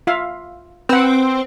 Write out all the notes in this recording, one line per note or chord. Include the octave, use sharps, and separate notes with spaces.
F4 E5 F5
C4 B4 F#5